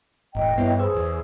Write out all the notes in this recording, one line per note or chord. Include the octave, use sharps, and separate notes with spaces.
E1 E2 A2 D#5 G5
G2 B3 E4 C#5
G#4 B4 C5 E6
E2